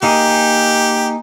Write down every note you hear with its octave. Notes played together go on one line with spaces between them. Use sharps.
A#3 D#4 G4 G#4